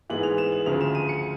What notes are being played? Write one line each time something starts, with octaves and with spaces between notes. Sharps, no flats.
G#2 E3 G#3 B3 F#7
F7
E7
F#7
D2 C#3 F3 F7
E7
D#7
C#7